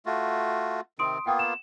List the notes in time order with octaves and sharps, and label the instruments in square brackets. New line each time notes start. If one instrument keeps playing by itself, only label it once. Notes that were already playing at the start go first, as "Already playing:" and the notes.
[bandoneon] A3 F4 F#4
[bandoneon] C3 D#3 C4 [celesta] C6 D#6 D7
[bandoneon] A#3 B3 F4 [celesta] F#5 G5 D#6
[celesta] E7